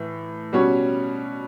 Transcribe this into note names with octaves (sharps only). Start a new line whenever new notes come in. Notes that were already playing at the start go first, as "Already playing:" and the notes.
Already playing: A2 E3
B2 G3 C#4 F#4 C#5